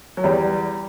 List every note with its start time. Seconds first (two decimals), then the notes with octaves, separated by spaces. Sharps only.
0.17 F#3
0.24 E2 G3